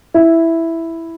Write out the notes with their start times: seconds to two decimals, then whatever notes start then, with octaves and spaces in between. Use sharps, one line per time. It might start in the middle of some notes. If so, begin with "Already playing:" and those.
0.14 E4